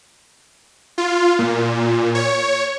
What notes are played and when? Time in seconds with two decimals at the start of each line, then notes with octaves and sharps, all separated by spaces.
0.98 F4
1.39 A#2
2.15 C#5